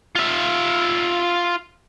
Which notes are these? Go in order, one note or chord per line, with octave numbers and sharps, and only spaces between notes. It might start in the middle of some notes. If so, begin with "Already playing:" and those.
F4 E5